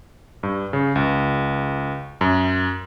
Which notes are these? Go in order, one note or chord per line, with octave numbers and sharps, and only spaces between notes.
G2
C#3
C#2
F#2